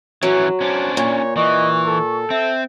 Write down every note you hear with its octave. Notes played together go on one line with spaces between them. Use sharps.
E3 F#3 C#4
C#4 D4 C5
A#2 C#5
E3 D#5 C#6
A4
C4 E5